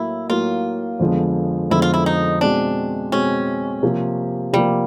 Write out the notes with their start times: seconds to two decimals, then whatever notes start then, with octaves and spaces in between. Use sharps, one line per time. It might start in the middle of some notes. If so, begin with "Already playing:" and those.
Already playing: A2 F#3 A#3 E4
0.29 A2 F#3 A#3 F4
0.99 F2 D3 F3 G#3 B3
1.70 F2 D3 F3 G#3 B3 E4
1.82 F4
1.94 E4
2.06 D#4
2.41 B2 G#3 C4 D4
3.12 B2 G#3 C4 C#4
3.83 C3 F3 A#3
4.53 C3 F3 G3 A#3